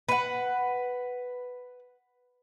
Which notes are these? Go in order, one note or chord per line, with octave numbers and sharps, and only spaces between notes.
B4 F#5